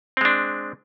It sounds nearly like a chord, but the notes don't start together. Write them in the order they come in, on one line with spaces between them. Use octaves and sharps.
C4 G#3 D4